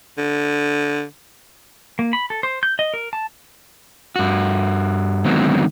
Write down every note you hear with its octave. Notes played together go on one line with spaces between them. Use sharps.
D3
A#3
B5
A4
C5
G6
D#5
A#4
A5
G2 F#4
D3 D#3 F#3 G#3 B3 C4